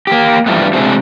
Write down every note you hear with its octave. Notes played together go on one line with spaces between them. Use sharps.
A#3 G4
G2 E3 F3 G3 A3 B3
C3 G#3 A3 C4 D4 F#4